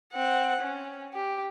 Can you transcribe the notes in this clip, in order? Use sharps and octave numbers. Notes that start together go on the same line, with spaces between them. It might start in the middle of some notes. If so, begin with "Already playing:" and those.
C4 F#5
C#4
G4